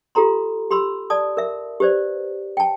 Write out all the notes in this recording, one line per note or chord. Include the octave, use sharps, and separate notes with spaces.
F4 G4 A4 A#5 C6
G4 B5 C6 E6
D5 A5 D#6
A#4 E5
G4 B4 C5 D5
G5 A5